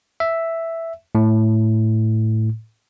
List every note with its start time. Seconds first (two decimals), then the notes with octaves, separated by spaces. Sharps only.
0.20 E5
1.15 A2